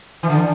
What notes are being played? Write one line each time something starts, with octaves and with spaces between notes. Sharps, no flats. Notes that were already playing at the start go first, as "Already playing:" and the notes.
E3
D3